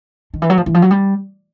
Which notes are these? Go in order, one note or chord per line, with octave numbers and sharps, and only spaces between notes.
D#3
E3
F#3
F3
E3
F3
F#3
G3